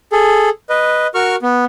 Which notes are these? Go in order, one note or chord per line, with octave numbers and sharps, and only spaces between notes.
G#4 A4
B4 D#5
F#4 A#4 C#6 F6
B3